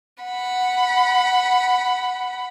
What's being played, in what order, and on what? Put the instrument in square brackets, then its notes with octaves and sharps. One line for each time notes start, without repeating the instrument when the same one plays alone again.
[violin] F#5 B5